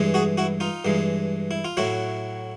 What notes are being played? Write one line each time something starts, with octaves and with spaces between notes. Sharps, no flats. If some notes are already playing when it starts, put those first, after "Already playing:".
Already playing: G2 E3 G#3
F#4 G#4
E4 F#4
D#4 F4
G2 E3 G#3
E4
F4
A2 F#3 E4 F#4